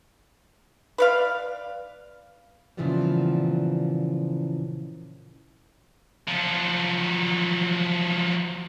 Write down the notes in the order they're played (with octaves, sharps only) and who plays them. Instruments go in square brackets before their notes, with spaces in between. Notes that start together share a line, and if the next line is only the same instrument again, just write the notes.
[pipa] B4 D5 F5
[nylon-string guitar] A#2 C#3 E3 F3 G3 B3
[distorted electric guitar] F3 F#3